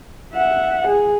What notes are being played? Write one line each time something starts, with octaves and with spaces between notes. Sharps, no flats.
E5 F#5
G#4